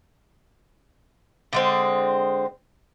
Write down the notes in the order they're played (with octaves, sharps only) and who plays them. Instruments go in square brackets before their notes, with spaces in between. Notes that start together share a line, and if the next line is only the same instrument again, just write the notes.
[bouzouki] D3 G#3 C4